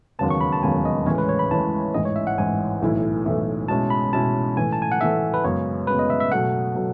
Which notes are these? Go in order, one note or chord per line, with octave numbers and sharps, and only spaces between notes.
E1 D#2 C#3 F#3 B3 A5
C#6
B5
A5
E1 D#2 C#3 F#3 B3 G#5
D#5
A2 E3 G#3 C#4 C#5
B4
C#5
B5
A2 E3 G#3 C#4 A5
A1 G#2 E3 D#5
C#5
E5
F#5
A1 G#2 E3 G#5
B1 A2 E3 A3 E4
B1 A2 E3 A3 E4
B2 G#3 C#4 E4 A5
B5
B2 G#3 C#4 E4 A5
A2 E3 A3 G#5
A5
G#5
F#5
A2 E3 A3 E5
B4
F#2 C#3 G#3 B3 C#5
F#2 C#3 G#3 B3 B4
D#5
E5
E5
B2 F#3 A3 F#5
B2 F#3 A3